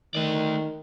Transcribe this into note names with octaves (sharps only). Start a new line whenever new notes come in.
D#3 A3 D5